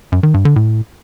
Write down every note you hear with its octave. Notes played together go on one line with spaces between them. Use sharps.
F#2
D#3
G2
D3
A2